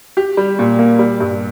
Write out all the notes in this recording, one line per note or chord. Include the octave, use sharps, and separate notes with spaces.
G4
G3
A#2
A#3
G3
G2